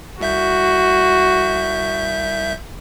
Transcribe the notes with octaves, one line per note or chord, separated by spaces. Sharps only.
C2 F#4 E5 G6